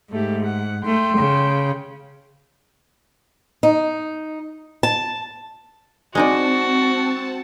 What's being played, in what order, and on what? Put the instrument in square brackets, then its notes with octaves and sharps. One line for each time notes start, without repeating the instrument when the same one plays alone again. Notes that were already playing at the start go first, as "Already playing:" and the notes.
[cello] G#2 [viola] A3 G4
[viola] F#5
[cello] A3 [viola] G5 C6
[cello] C#3
[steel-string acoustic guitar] D#4
A5
[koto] G#3 D#4 D5 [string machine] C4 A5 [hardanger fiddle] F#4